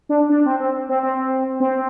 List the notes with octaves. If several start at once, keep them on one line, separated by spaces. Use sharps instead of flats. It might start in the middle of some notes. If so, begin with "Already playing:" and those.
D4
D4
C4
C4
C4
C4
C4